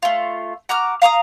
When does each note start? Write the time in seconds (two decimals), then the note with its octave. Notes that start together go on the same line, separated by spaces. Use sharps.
0.03 A3 F4
0.69 F#4 A#5 D6 F6
1.02 F5 A#5 C#6 D#6